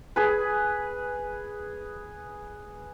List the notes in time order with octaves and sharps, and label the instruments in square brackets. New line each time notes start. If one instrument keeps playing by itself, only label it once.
[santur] G#4 B4